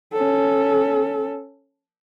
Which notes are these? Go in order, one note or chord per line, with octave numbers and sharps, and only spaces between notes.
C#4 A4